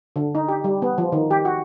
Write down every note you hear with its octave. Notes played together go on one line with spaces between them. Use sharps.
D3
D#4
G4
G3
B3
F3
D#3
G4
F#4